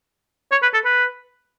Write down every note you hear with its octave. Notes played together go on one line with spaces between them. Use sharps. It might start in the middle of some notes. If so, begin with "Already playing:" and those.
C#5
B4
A4
B4